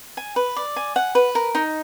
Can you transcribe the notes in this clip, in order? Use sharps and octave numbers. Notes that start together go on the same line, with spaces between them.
G#5
B4
D5
G#5
F#5
B4
A#4
D#4